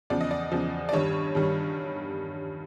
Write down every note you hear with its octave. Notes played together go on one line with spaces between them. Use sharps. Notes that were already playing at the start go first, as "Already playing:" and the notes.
E2 C#3 F3 D5
D#5
D5
E2 C#3 F3
D5
G2 D#3 G3 C#5
G2 D#3 G3